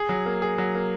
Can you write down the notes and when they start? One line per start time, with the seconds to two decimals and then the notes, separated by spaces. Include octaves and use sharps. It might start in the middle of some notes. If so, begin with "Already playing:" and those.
Already playing: G#4
0.09 F#3
0.26 A#3
0.42 G#4
0.58 F#3
0.75 A#3